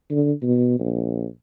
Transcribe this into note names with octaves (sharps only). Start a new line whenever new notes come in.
D3
B2
A#1